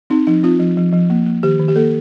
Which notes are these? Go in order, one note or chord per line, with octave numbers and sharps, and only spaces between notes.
C4 D#4
F3 D#4
C4 F4
F3
F3
F3
A#3
A#3
D#3 G4
D#3
G4
A#3 A4